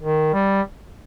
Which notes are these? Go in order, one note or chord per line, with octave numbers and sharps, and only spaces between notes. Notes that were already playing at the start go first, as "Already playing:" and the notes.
D#3
G3